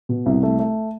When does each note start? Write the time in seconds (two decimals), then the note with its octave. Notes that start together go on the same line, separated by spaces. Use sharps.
0.09 B2
0.26 C2
0.43 A3
0.59 A3